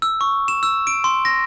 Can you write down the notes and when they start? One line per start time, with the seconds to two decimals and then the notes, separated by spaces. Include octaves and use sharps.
0.02 E6
0.21 C#6
0.48 E7
0.63 E6
0.87 D7
1.04 C6
1.25 A#6